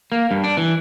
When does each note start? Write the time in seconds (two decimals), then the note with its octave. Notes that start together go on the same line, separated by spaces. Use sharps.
0.12 A#3
0.31 G2
0.44 D4
0.57 E3